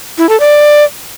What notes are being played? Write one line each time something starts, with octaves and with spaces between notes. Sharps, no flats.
E4
A4
D5